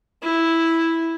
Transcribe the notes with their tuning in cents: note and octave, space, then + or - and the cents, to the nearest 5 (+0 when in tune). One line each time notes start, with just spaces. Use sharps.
E4 -5